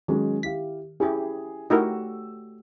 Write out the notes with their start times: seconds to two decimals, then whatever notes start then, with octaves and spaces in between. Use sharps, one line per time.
0.08 D#3 F#3 G#3 C#4
0.43 E4 G4 F5 B6
1.00 C#4 E4 G4 G#4
1.70 A3 D#4 E4 F#4 G4 A#4 E6